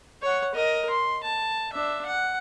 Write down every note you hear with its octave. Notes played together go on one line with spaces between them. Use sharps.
C#5 F#5
A#4 D#5
C6
A5
D4 E5
F#5